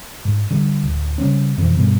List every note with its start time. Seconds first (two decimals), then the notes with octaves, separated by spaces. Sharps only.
0.25 G#2
0.51 D3 G3
0.83 D1
1.18 C#3 G3 C4 C#4
1.58 F2 B2 E3 C4
1.77 G2 B2 G3 B3